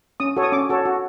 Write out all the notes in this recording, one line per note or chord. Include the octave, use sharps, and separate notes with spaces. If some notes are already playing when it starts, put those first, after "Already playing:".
C#4 D#6
F#4 A4 C#5
D#6
C#4 D6
F#4 A4 C#5
F#4